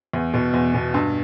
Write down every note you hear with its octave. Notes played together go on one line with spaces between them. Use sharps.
E2
B2
E2
B2
G2